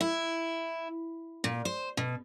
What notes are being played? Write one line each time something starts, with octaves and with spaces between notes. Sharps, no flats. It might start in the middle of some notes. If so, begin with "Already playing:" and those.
E4
A#2
C5
B2